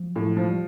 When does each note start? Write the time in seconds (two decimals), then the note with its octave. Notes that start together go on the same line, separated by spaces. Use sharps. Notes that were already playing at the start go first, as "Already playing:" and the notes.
Already playing: F3 F#3
0.16 A2
0.26 F3
0.37 F3
0.50 G3